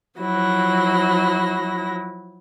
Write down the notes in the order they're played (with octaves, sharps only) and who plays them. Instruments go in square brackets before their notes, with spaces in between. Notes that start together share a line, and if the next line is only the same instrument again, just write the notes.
[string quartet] F3 F#3 E4 A#6